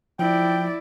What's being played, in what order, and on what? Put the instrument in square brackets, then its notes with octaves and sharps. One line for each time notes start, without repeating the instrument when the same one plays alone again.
[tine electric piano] F3 [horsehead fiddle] E4 D5 [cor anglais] G5